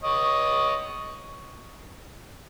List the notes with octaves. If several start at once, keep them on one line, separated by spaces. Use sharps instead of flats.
C#5 D#5